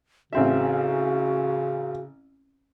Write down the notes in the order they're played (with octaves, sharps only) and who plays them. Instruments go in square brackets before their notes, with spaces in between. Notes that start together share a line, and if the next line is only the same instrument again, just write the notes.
[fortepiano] A1 C4 E5 [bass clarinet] C#3 [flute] F#4